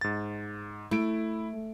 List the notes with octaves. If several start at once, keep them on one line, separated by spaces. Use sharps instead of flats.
G#2 A6
A3 E4 D7